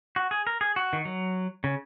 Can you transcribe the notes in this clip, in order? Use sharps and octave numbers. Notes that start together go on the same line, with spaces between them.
F#4
G#4
A#4
G#4
F#4
D#3
F#3
C#3